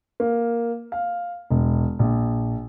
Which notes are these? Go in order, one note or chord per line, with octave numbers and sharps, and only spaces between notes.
A#3
F5
E1
A#1